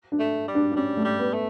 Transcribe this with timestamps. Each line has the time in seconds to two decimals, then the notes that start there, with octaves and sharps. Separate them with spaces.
0.12 D4
0.19 A3
0.48 G3
0.55 D4
0.72 D4
0.76 G3 C#4
0.97 A3
1.04 G3
1.19 B3
1.33 A3